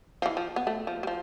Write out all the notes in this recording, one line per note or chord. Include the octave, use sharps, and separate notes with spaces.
F3
E3
F3
B3
A3
F3
G3
F3